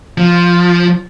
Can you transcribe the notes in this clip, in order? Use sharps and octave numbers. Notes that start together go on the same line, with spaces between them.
F3